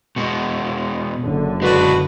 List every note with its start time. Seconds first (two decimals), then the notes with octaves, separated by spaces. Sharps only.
0.16 B2 G#3
1.23 F#1 D3
1.62 G#3 D4 F#4 B4